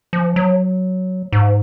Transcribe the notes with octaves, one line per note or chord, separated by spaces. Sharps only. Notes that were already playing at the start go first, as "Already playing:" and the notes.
F3
F#3
G#2